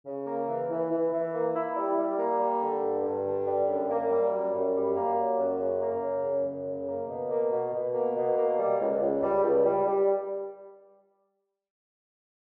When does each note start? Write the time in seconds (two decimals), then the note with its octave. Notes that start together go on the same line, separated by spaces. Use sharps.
0.05 C#3
0.27 A#3
0.48 E3
0.70 E3
0.91 E3
1.12 E3
1.33 A#3
1.55 E4
1.76 G3
1.98 G3
2.19 A#3
2.39 G3
2.61 D3
2.83 G2
3.04 G2
3.25 D3
3.46 G3
3.67 F#2
3.89 A#3
4.10 G3
4.32 F#2
4.53 F#2
4.75 G3
4.96 A#3
5.17 F#3
5.39 F#2
5.60 C#3
5.81 A#3
6.02 C#3
6.24 F#2
6.45 F#2
6.66 C#3
6.87 A#3
7.08 B2
7.30 A#3
7.51 B2
7.73 B2
7.94 A#3
8.15 B2
8.37 A#3
8.58 G3
8.79 C#2
9.01 C#2
9.22 G3
9.43 C#2
9.65 G3
9.86 G3